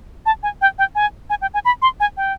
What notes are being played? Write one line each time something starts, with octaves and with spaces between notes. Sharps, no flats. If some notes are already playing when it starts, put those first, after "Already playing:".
A5
G#5
G5
G5
G#5
G#5
G5
G#5
B5
C6
G#5
G5